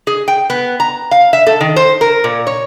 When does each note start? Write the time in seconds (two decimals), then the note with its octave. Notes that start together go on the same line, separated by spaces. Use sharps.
0.07 G#4
0.28 G5
0.50 B3
0.80 A#5
1.11 F5
1.33 E5
1.47 A4
1.61 D#3
1.76 C5
2.01 A#4
2.24 A#2
2.47 C#5